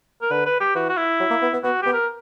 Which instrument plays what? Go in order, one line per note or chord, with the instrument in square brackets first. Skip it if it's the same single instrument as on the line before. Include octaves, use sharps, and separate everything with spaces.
[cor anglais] A#4
[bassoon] D3 [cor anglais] B4
[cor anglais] B4
G4
[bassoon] E3 [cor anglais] F#4
[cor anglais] F#4
E4
[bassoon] F#3
A#3
B3
B3
[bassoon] B3 [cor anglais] F#4
[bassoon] B3 [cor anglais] G4
[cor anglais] A#4